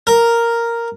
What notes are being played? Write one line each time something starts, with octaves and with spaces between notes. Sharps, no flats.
A#4